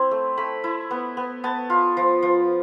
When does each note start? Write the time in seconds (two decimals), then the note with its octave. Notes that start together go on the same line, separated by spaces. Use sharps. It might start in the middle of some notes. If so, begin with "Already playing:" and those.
Already playing: C4 E4
0.11 A3
0.37 A3 B5
0.64 E4
0.91 B3
1.17 B3
1.44 B3 A5
1.70 F4
1.97 F3
2.22 F3